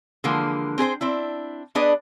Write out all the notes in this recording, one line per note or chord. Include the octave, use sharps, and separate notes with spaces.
D3 E3 F3 G#3 A#3
C4 G#4 B4 C5
C4 D4 E4
B3 D4 G#4 B4 D5 D#5